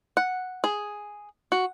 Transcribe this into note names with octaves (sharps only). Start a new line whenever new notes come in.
F#5
G#4
F#4